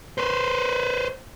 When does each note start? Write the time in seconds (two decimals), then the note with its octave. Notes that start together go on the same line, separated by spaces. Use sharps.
0.18 B4 C5